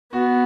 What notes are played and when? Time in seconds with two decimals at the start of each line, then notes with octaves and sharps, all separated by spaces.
0.12 B3 F#4